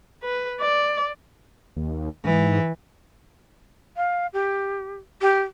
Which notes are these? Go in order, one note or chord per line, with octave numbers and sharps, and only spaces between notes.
B4
D5
D#2
G#2 E3
F5
G4
G4